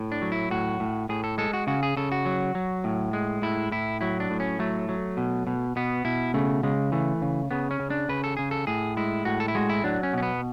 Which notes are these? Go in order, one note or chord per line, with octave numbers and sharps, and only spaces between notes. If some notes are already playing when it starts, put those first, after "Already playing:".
Already playing: A2
D4
F#3
E4
A2 F#4
A2
A2 G#4
A4
G#3 A4
F#4
C#3 F#4
G#4
C#3 A4
F#4
F#3
F#3
A2
G#3
A2 E4
A2 E4
F#3 E4
D4
A2
C#4
F#3 A3
F#3
B2
B2
B2 B3
B2 E4
C#3 A3
C#3 G#3
E3 A3
C#3
C#3 B3
C#4
C#3
D4
C#3 B4
A4
C#3 G#4
A4
A2 G#4
G#3 E4
A2 F#4
A4
E4
G#3 F#4
E4
F#3 D4
C#4
B2 C#4
B3